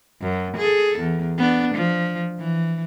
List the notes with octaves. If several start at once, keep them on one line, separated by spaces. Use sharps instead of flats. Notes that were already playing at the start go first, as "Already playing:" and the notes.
F#2
G#4 A4
E2
B3 D4
F3
E3